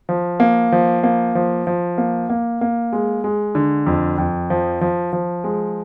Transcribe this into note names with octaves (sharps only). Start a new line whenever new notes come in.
F3
A#3
F3
A#3
F3
F3
A#3
A#3
A#3
G#3
G#3
D3
F2
F2
F3
F3
F3
G#3